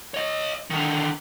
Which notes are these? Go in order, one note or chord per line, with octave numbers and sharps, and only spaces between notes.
C#5 D#5
D3 D#3